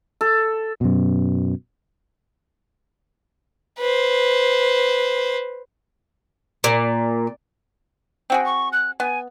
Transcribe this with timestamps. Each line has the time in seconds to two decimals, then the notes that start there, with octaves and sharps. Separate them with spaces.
0.21 A4
0.81 F#2 B2
3.79 B4 C5
6.64 A#2
8.30 C4 F#4 G#4 G5
8.46 C#6
8.73 F#6
9.00 B3 G#5